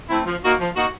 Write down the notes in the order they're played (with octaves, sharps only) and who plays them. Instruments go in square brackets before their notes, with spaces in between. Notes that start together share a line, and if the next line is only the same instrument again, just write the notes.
[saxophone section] A3 C4 E4
F3
A#3 D#4 F#4
F3
A#3 D#4 F#4